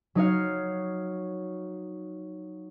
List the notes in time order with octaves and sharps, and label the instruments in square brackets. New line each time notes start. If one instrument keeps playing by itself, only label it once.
[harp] F#3 D#4 C#5 F5